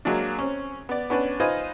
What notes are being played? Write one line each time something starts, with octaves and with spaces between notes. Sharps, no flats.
F#3 G#3 A#3 D4
C4 C#4
B3 D5
B3 C#4 D4 B4
D#4 F4 B4 C5 D#5 G#5